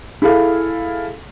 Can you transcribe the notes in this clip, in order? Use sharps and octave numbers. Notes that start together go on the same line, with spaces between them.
E4 G#4 A4 F5